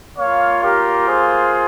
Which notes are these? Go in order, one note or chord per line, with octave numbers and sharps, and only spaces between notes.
A#3 F4 C#5 F5
G4 A#4
G#4 C5